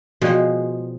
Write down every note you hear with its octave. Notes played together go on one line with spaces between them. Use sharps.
B2 F3 G#3 F#4 D5 G5